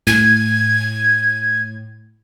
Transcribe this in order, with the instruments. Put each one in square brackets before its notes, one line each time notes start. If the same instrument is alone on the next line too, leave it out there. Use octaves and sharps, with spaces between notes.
[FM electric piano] A2 [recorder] G#6